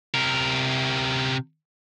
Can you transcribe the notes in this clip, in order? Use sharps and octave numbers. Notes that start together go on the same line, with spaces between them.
C3 A#4